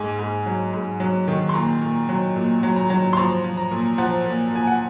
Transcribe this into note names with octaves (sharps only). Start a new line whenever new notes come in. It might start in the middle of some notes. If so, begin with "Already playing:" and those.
Already playing: G#2 G#5
G#2
F#3
G#2
F#3
D#3
C6
A#2 A#5
A#2
F#3
A#2
F#3
A#5
F#3
C6
F3 A#5
F3
A#5
A#2
F3 F#5
A#2
A#2 G#5
F#5